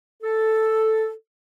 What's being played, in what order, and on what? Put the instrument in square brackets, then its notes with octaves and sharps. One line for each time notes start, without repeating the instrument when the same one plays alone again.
[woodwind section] A4